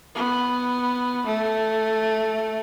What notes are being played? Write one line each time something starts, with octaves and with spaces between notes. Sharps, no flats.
B3
A3